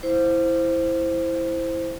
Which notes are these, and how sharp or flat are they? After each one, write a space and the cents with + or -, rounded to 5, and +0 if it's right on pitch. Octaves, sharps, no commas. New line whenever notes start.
E4 +0 C5 +0